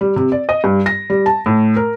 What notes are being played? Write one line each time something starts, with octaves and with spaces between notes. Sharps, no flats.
G3
C3
D5
D#5
G2
A#6
G3
A5
A2
A#4